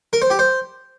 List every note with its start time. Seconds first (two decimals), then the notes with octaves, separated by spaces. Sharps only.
0.13 A#4
0.22 C5
0.30 G4
0.39 C5